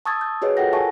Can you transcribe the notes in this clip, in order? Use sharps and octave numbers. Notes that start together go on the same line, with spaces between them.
A5 C#6 D#6 E6 G#6 A6
G6
F#4 G#4 B4 C#5 D#5
F4 A4 A#4 F#5 G5 A#6
E5 G#5 A5 C#6